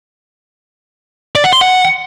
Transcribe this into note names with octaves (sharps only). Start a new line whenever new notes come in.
D5
F#5
C6
F#5